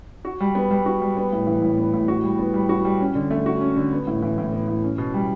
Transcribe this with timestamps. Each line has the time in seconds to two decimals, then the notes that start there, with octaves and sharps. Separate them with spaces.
0.25 F#4
0.40 G3
0.55 B3
0.71 G3
0.86 F#4
1.02 G3
1.17 B3
1.32 A2
1.47 E3
1.62 A2
1.78 B3
1.93 A2
2.08 F#4
2.23 G3
2.39 B3
2.54 G3
2.69 F#4
2.85 G3
3.00 C#4
3.15 D3
3.31 A3
3.46 F#4
3.61 C#4
3.76 D3
3.92 B3
4.07 A2
4.23 E3
4.38 A2
4.52 B3
4.68 A2
4.83 C#4
4.98 B2
5.14 G3